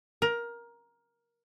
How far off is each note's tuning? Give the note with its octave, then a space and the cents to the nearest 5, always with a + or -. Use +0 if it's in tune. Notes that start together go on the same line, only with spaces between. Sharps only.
A#4 +15